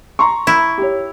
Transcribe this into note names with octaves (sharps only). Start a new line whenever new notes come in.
A#5 C6 C#6
E4
G4 C#5